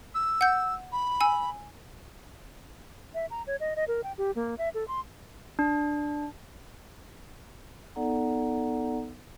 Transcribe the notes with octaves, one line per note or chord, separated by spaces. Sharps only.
E6
F#5 G6
B5
G#5 E6
E5
A#5
C#5
D#5
D#5
A#4
G5
G4
A#3
E5
A4
C6
D4
B3 D#4 A4 D5 F#5 A#5